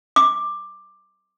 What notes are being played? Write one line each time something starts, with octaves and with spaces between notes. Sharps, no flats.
D6